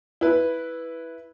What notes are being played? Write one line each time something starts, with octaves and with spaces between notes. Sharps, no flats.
E4 B4